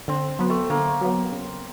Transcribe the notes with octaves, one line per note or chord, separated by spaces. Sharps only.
D3 C4
F#3 B3
A3
D3 A#3
F#3 B3
C#3